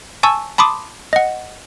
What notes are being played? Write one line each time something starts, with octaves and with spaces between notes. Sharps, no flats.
G#5 A5 C#6 E6
A5 B5 C6 D6 D#6
D#5 F#5